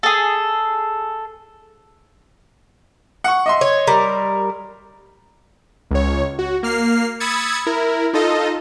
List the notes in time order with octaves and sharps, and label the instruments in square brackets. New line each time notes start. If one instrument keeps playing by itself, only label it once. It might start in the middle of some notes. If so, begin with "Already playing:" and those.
[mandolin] G#4 A4
[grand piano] F#5 C#6
D#5 E5 C6
[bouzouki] C#5
G3 A#4
[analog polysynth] C#2 C#5
F#4
A#3 F6 C7
B5 D#6 E6 G#6 A6 C#7
E4 A#4
D#4 F4 A4 D#5